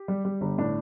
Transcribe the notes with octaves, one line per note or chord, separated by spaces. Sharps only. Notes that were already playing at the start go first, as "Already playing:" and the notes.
Already playing: G4
G3
G3
G1
A2 D4